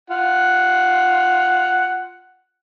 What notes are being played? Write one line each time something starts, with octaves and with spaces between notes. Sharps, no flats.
F4 F#5